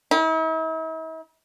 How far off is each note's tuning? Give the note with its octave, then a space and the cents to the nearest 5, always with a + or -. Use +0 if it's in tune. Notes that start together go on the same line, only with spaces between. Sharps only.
E4 -45